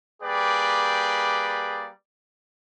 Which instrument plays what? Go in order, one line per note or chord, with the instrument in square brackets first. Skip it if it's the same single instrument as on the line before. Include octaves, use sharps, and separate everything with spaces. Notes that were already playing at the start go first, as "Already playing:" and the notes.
[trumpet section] G3 A#3 G#4 B4 D5 G5